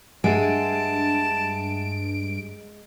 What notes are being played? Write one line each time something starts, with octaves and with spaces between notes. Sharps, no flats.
G2 G#3 E5 F#5 G#5 A5 D7